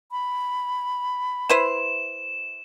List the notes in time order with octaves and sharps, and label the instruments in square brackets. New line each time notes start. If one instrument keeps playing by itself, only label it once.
[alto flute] B5
[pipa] E4 B4 C5 [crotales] E7